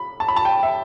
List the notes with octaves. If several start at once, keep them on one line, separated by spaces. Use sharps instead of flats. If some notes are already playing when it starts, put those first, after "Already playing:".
Already playing: B5
A5
B5
A5
G5
E5